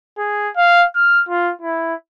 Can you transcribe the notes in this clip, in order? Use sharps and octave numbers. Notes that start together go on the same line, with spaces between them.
G#4
F5
F6
F4
E4